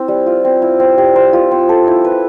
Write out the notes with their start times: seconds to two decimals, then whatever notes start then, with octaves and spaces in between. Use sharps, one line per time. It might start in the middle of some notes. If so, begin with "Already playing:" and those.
Already playing: C4 E4
0.08 G3
0.26 F4
0.45 C4
0.62 E4
0.80 C4
0.98 G4
1.16 C5
1.33 F4
1.51 C4
1.69 A4
1.88 E4
2.04 B4